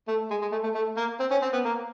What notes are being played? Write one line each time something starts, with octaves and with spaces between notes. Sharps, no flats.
A3
G#3
G#3
A3
A3
A3
A#3
C4
C#4
C4
B3
A#3